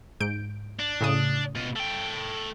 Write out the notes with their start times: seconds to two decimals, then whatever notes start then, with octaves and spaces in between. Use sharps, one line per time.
0.20 G#2 G6 D7
0.80 D4
1.01 A2 C#3 D#6
1.55 B2 F4
1.76 A3 G5